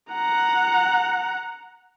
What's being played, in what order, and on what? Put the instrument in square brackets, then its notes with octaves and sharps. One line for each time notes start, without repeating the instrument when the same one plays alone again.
[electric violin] F#5 A#5